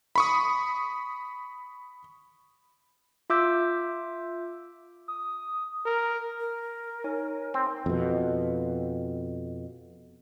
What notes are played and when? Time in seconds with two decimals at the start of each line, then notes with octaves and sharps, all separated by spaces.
0.16 B5 C#6 D#6
3.30 F4 E5 D6 E6 G6
5.08 D#6
5.86 A#4
6.39 A#4
7.04 D#4 C#5 G#5
7.54 C4 C6
7.86 F2 B2